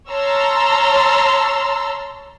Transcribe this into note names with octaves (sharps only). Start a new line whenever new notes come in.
C#5 A5 A#5 C6 E6 F6